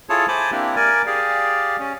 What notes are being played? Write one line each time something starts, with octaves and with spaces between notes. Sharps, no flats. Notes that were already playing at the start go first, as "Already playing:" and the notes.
E4 F4 G#4 A4 C#5 A5
C5 G#5 A5 B5 D6
A#3 C4 D4 E4 G4
A#4 D5 G#5
G4 G#4 D5 F5
C#4